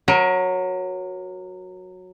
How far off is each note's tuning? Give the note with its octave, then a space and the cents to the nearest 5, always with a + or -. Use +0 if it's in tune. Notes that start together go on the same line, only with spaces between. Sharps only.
F#3 -10 A#4 +35